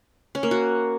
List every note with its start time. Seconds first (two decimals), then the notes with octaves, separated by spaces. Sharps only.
0.35 C#4
0.43 A#3
0.51 F#4